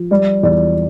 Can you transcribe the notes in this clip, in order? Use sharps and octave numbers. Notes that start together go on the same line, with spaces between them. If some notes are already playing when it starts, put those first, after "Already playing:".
Already playing: F3
G3 D5
E2 D5